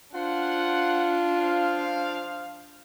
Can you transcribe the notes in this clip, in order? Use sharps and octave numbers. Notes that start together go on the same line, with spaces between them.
D4 F4 C5 F5 F#5
F3 C5 F5